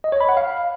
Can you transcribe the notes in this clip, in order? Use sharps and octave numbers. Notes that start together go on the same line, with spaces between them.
D#5
C#5
B5
F#5
F5